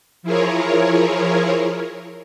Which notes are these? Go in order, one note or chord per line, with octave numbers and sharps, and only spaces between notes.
F3 E4 F4 G#4 A#4 C#5